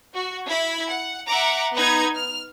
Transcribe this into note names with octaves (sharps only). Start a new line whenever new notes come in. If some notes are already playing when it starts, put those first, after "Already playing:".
F#4
E4 B5 G#6
F#5
E5 F#5 A#5 D6
B3 D#4 B4 A#5 G#6
F6